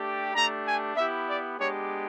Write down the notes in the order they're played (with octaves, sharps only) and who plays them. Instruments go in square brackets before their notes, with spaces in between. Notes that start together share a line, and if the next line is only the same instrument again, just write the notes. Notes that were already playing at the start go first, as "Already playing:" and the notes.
Already playing: [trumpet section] A3 D4 G4
A3 D4 G4 A#5
G#5
B3 E4 G4 E5
D5
G#3 B3 D4 G4 C#5